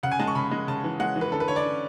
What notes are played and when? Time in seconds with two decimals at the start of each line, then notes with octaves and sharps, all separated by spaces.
0.03 C#3 F#5
0.11 G#5
0.19 G#3 A5
0.27 C#6
0.35 C#3 B5
0.51 G#3
0.67 C#3 A5
0.84 E3
1.00 G#3 F#5
1.16 E3
1.21 B4
1.32 D3 A4
1.40 B4
1.48 D3 C#5
1.56 D5
1.65 C#4